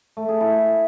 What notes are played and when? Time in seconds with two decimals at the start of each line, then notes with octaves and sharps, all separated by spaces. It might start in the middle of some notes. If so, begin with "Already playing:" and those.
0.17 A3
0.29 G#4
0.40 E4